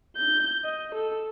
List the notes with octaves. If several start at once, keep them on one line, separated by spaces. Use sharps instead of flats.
G6
D#5
A4